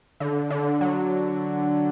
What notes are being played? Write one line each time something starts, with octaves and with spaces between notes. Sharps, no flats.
D3
D3
F#3